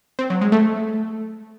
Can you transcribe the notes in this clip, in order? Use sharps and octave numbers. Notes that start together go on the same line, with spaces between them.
C4
F#3
G#3
A3